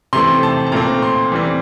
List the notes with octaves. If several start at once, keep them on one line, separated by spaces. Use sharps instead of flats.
C3 E3 A3 C4 C6
A5
A5
A#2 A3 C4 A#5
C6
E3 G3 C4